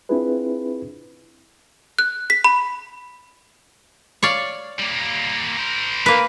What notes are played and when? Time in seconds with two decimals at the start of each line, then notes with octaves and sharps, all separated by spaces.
0.09 C4 D4 E4 F4 G#4 B4
1.99 F#6
2.30 B6
2.44 B5
4.23 C#5 D5 F5
4.79 G3 A#3
5.57 A#4 C5
6.06 A#3 B4